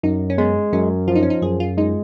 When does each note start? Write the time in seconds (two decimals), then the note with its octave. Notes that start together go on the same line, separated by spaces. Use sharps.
0.03 F#2 D#4
0.30 C#4
0.38 G#3 B3
0.73 F#2 C#4
1.08 F3 F4
1.16 D#4
1.23 C#4
1.30 D#4
1.42 F#2 G#4
1.60 F4
1.77 G#3 D#4